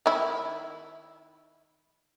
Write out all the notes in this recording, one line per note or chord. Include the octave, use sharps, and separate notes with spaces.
D#3 E4